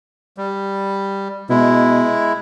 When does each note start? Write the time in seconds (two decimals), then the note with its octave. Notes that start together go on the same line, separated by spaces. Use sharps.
0.38 G3
1.50 B2 G#3 E4